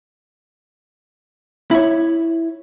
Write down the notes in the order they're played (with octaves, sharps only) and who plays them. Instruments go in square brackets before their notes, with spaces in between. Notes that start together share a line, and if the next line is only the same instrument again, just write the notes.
[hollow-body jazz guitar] E4 C#5